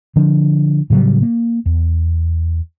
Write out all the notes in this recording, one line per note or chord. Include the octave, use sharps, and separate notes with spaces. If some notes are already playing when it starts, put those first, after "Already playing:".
D3 F3 D4
A2 C#3 F#3 G3
A#3
E2